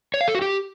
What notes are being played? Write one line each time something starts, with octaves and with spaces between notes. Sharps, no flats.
C#5
F5
A4
F#4
G4